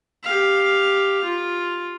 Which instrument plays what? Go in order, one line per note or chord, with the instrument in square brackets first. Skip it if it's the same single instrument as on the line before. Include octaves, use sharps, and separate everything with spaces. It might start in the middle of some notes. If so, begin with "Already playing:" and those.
[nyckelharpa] G4 F5
F4